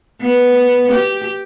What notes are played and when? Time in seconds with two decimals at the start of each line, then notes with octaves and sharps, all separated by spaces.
0.21 B3
0.92 G4